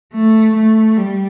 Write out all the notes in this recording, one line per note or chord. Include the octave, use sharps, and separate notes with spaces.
A3
A3
G3